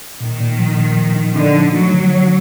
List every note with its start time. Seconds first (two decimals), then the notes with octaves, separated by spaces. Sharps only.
0.20 A#2 D#3
0.40 A#2
0.59 F3
0.78 A#2
0.97 F3
1.16 D#4
1.36 D3 D#4
1.55 F3
1.74 F#3 A3
1.94 D3
2.12 D3